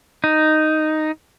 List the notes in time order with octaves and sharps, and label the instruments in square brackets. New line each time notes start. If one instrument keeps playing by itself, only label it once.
[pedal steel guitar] D#4